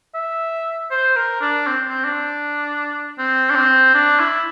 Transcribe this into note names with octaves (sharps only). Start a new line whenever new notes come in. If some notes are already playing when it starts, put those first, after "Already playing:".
E5
C5
A#4
D4
C4
C4
D4
C4
D4
C4
D4
E4